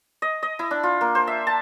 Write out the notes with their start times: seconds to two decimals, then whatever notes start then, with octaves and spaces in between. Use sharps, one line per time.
0.22 D#5
0.43 D#5
0.59 E4
0.71 D4
0.83 F4
1.01 A#3
1.15 C5
1.27 E5
1.47 A5